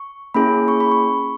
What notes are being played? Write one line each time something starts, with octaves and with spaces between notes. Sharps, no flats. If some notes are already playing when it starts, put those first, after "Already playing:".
Already playing: C#6
A#3 C#4 E4 G#4 B5
C#6
B5
C#6